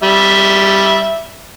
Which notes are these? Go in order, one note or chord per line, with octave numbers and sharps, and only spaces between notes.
G3 E5